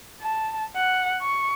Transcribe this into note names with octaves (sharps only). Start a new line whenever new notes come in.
A5
F#5
C#6